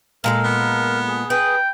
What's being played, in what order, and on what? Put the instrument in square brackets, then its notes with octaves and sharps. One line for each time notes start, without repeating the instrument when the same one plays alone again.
[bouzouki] A#2 G#3 A4 [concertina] A#4
[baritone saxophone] B3
[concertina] G#4
[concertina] G#4 [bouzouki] B4 [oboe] G5